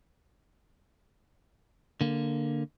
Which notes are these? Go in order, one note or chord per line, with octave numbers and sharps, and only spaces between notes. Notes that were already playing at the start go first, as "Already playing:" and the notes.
D3 A#3